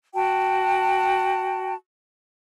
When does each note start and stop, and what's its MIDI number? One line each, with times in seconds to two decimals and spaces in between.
0.15 1.74 66
0.15 1.74 79
0.15 1.74 81